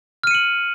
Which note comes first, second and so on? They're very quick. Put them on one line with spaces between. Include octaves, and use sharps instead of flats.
F6 D#7 C#7 F#7